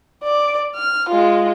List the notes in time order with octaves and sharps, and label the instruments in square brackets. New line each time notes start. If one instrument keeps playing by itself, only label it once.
[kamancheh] D5
F6
G#3 F4